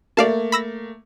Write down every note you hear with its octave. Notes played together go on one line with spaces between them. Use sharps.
A3 A#3 D5 F5 A5
B5 E6 A#6